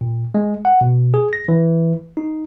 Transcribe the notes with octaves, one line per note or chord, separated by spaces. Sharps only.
A#2
G#3
F#5
B2
G#4
A#6
E3
D#4